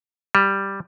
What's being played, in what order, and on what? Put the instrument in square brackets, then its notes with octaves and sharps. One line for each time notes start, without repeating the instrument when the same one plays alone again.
[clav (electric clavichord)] G3